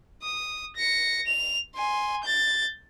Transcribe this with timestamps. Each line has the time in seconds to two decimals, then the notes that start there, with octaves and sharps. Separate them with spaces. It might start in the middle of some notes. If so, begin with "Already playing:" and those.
0.22 D#6
0.76 A#6 C#7
1.26 F7
1.75 G#5 C6
2.24 G6 A6